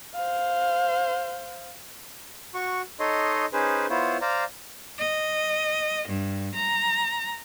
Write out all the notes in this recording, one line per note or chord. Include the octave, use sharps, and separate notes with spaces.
C5 F5
F#4 C#6
D#4 A4 C#5 D#5 C6
C#4 D#4 G#4 B4 C5
B3 E4 F4 C5 C#5
C5 D5 F5 A#5
D#5
G2
A#5